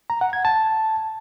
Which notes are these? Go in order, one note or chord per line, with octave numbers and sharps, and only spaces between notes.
A#5
F#5
G#6
A5